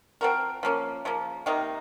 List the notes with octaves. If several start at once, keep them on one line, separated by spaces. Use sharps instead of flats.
F3 C4 F#4 A#4
F3 A#3 C#4
C#3 F3 A#3
C3 D#3 A#3 D#4